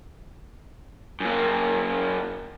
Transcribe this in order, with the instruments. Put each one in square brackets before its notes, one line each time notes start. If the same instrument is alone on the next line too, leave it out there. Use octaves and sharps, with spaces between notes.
[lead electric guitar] F#2 A#3